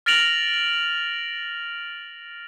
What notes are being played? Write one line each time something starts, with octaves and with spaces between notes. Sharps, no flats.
F6 A6 A#6 D7 F7 F#7